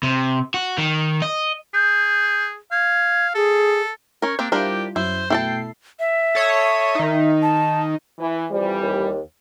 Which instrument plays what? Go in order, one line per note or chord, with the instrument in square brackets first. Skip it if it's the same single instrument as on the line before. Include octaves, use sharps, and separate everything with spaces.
[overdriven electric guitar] C3
F#4
D#3
D#5
[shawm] G#4 [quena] G6
[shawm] F5 [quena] G#6
[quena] G#4 [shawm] A4
[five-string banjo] C#4 A#4 [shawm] C#5
[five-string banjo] A#3 C4 G4 [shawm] D4
[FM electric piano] G3 E4 F4 [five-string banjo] D4 A#4 C5 [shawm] G4
[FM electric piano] F#2 F#3 [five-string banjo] E4 [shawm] C5
[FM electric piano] B2 A3 C7 [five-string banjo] E4 A4 A5 [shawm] G5
[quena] E5
[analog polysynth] A4 C#5 D#6
D#3 D#4
[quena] A5
[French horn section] E3
[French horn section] F2 E3 G3 [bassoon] F3
[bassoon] D#2